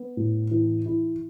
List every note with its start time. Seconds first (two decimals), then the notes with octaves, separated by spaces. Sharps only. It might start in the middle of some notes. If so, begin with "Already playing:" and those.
Already playing: B3
0.17 A2
0.51 E3
0.86 E4